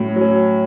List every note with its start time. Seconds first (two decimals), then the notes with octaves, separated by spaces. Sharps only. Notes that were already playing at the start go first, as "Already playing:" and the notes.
Already playing: A2 F#3 C#4
0.16 F#3 C#4